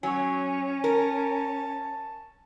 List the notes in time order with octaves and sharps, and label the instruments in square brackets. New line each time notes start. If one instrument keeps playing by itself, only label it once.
[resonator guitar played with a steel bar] F#3 [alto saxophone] C#4 [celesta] G#5 C#6
[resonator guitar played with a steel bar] A#4 [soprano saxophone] A5